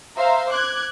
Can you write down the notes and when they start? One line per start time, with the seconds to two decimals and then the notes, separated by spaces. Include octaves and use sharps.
0.16 C5 E5 F5 A#5
0.50 D6 F#6 G#6